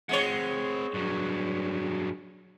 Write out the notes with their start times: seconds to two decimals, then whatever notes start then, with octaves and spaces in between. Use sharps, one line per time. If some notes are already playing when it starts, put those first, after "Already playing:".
0.09 G#3 C4 C#5 F#5
0.94 G2 F#3